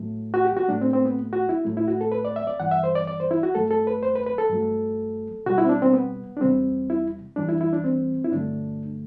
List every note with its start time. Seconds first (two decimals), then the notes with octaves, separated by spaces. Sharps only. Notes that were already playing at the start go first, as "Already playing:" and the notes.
Already playing: A2 F#3 A3
0.34 F#4
0.45 G4
0.57 F#4
0.69 A2 F#3 A3 D4
0.81 C4
0.93 C4
1.05 B3
1.33 F#4
1.49 E4
1.65 A2 F#3 A3
1.77 E4
1.88 F#4
2.01 A4
2.12 B4
2.25 D5
2.36 E5
2.47 D5
2.60 G2 E3 G3 F#5
2.71 E5
2.84 C5
2.95 D5
3.07 D5
3.20 C5
3.31 E4
3.43 F#4
3.55 G2 F#3 A3 A4
3.71 A4
3.87 B4
4.03 C5
4.15 B4
4.26 B4
4.38 A4
4.50 G2 F#3 A3
5.46 B2 G3 F#4
5.58 E4
5.65 C4
5.69 D4
5.82 C4
5.93 B3
6.37 D4
6.41 E2 C3 G3 C4
6.90 E4
7.36 F#2 E3 G3 D4
7.49 E4
7.61 E4
7.73 D4
7.84 C4
8.24 E4
8.32 G2 D3 F#3 A3 D4